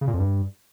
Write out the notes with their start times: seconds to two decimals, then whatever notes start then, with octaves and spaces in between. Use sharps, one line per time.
0.01 C#3
0.07 A#2
0.13 F2
0.20 G2